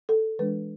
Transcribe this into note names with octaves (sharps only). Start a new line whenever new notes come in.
A4
E3 G#3 D4 B4